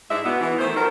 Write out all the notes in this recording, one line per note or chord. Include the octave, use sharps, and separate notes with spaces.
G#2 G#3 D4 E4 E5
B2 B3
E3
D#3 A3 C5
F3 F#3 B3 D#4 A#4